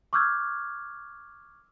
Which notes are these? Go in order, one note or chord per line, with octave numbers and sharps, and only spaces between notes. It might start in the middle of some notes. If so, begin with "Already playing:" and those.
C#6 D6 E6 F6 G6 G#6